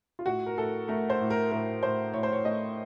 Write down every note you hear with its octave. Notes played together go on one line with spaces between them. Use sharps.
F4
A2 F#4
A#4
A2 A4
A3 A#4
C5
A2
A#4
A2 A#4
A2 C5
A2 C#5
C5
C#5
A3 D#5